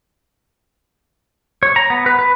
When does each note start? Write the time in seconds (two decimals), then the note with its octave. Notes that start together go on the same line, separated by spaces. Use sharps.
1.63 C#5
1.76 A#5
1.90 B3
2.06 B4
2.19 B4